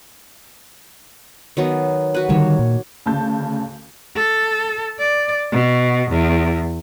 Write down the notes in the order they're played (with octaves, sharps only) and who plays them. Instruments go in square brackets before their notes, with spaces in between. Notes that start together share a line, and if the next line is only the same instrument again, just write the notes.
[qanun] D#3 F#3 B3
F#4 B4
[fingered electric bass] D3 D#3 G3 [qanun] A#3 C#5 A5
[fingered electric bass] A#2
[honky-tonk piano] D2 C#3 A5 G6
[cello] A4
D5
B2
E2